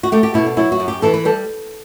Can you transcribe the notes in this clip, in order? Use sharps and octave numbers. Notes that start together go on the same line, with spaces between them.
F#4
A3 G4
G4
B2 E4
D4
F#3 E4
F#4
F#2
G4
E3 A4
B4
G3 A4